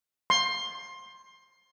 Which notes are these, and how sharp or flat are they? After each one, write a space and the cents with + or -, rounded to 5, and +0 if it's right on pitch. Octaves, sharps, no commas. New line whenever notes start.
C6 +20